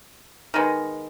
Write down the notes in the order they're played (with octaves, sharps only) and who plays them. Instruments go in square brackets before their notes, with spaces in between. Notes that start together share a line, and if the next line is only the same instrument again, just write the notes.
[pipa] D#3 G#3 B3